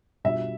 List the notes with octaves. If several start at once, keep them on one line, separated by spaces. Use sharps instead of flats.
B2 G3 D4 F4 E5